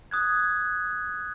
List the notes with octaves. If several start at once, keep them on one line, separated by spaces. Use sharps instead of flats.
D#6 F#6 G#6